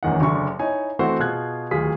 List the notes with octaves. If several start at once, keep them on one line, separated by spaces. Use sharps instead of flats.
D#1 A1 E2 D#3 F#5
F#1 D3 D4 C6 C#6
D#4 E4 C#5 G#5
E3 A3 C4 F#4 C5
B2 F4 G#4 F#6 G#6
D1 D#2 F4 G#4 B6